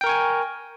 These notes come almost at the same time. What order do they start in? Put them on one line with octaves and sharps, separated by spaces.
G5 A#4 C#6 G#5